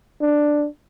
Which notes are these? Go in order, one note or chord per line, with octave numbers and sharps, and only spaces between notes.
D4